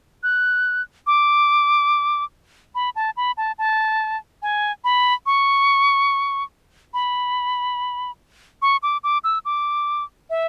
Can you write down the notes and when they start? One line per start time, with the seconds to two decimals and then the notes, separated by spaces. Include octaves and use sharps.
0.23 F#6
1.07 D6
2.75 B5
2.96 A5
3.17 B5
3.37 A5
3.58 A5
4.42 G#5
4.84 B5
5.26 C#6
6.94 B5
8.62 C#6
8.83 D6
9.04 D6
9.24 E6
9.45 D6
10.30 E5